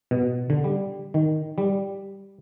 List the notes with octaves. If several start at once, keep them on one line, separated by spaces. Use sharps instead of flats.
B2
D3
G3
D#3
G3